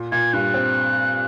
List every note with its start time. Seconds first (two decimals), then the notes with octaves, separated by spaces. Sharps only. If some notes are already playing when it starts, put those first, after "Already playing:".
Already playing: A#2
0.12 A#2 G#6
0.33 G2 F#6
0.54 C4